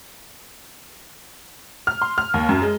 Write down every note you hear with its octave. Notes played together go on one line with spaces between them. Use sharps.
F6
C6
F6
D#2
F#2
G#3